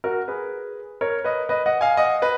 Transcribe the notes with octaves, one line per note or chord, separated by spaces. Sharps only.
F#4 A#4
G#4 B4
A#4 C#5
B4 D#5
B4 D#5
D#5 F#5
F5 G#5
D#5 F#5
B4 D#5